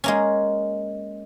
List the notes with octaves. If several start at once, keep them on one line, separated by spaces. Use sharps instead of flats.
G#3 A#3 C#4